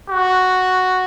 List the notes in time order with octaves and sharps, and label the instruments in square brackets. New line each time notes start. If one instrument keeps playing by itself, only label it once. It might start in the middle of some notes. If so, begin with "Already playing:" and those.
[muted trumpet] F#4